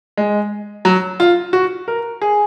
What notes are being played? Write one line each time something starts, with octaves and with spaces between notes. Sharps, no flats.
G#3
F#3
F4
F#4
A#4
G#4